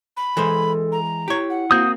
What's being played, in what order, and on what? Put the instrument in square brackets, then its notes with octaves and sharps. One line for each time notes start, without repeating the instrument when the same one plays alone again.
[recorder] B5
[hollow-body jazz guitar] E3 G#3 C5 [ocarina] A4
[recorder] A#5
[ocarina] E4 [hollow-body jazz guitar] G4 C#5
[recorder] F#5
[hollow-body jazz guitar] A#3 C4 F#4 [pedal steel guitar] D#6 G6